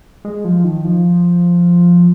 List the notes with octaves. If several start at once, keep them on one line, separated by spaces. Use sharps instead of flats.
G#3
F3
D#3
F3